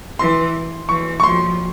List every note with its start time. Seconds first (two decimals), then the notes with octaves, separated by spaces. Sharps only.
0.19 E3 C6
0.89 E3 C#6
1.20 C#6
1.24 F3 C6